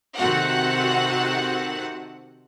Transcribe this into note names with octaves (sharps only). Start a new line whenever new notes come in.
C3 D#3 C4 F#4 A4 F#5